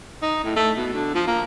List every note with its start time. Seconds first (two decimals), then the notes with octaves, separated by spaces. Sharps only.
0.22 D#4
0.44 A2
0.56 A3
0.77 B2
0.94 D3
1.15 F3
1.27 A#3